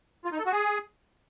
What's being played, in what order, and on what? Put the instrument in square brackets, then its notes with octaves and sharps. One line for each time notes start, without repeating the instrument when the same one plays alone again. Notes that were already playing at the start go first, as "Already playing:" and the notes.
[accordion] F4
D#4
A4
F#4
G#4